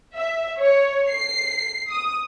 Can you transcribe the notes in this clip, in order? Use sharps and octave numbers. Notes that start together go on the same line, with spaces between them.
E5
C#5
C7
D#6